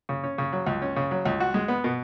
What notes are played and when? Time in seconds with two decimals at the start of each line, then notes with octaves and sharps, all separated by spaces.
0.09 C#3
0.24 C#4
0.38 C#3
0.52 F#3
0.66 C#2
0.82 C#4
0.96 C#3
1.11 F#3
1.25 C#2
1.40 F#4
1.54 G#3
1.68 B3
1.84 B2